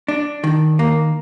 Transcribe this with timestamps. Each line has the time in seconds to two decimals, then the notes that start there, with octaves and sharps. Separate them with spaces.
0.08 D4
0.44 D#3
0.79 A#3